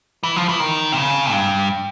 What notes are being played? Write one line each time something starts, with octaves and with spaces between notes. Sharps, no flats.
E3
F3
E3
D#3
C3
C#3
G2